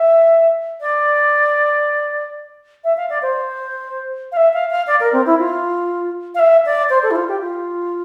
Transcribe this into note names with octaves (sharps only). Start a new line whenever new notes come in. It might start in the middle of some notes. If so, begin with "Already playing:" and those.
Already playing: E5
D5
E5
F5
D5
C5
F5
E5
F5
F5
D5
A#4
C4
E4
F4
F5
E5
D5
C5
A4
E4
F4
G4
F4